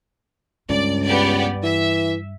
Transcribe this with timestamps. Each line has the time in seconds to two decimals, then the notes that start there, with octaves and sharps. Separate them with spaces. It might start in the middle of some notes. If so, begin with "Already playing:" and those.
0.69 C#2 G2 D5
1.04 B3 G4 D5
1.63 E3 E5